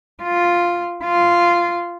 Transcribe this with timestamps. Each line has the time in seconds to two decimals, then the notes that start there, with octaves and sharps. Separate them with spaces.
0.23 F4
1.04 F4